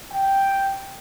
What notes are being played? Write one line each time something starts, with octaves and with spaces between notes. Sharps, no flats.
G5